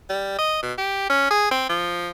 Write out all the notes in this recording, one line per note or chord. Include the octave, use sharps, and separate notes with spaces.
G3
D#5
B2
G4
C#4
G#4
C4
F3